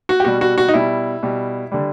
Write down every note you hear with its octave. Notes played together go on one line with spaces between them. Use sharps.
F#4
G4
B2 G3 F#4
F#4
F#4
D#4
B2 G3 E4
B2 G3
D3 G3